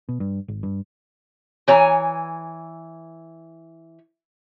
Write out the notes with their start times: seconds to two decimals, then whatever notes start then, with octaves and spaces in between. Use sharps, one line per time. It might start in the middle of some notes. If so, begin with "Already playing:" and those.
0.09 B2
0.20 G2
0.48 G#1
0.63 G2
1.68 E3 C#5 G#5 A#5